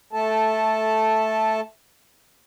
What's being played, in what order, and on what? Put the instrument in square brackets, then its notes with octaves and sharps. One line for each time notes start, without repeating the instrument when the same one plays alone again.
[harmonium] A3 A4 A5